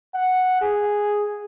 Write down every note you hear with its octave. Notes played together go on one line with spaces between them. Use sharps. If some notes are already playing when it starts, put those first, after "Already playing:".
F#5
G#4